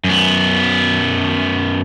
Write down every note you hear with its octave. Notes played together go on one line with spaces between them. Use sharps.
F#2 B3